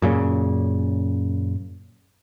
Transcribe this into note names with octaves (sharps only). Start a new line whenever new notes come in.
F#2 A#2 C#3